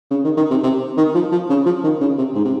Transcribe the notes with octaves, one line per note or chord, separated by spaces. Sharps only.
C#3
D#3
D#3
C3
C3
D#3
F3
F3
C#3
F3
D#3
C#3
C3
G#2
C3